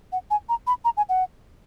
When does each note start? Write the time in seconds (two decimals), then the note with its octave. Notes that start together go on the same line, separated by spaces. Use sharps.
0.12 F#5
0.30 G#5
0.49 A#5
0.67 B5
0.85 A#5
0.97 G#5
1.09 F#5